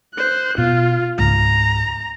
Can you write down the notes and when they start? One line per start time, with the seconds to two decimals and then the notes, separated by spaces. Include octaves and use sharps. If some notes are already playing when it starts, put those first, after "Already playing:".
0.15 C5 F#6
0.58 B2 F4
1.19 C#2 G#2 G#3 A#5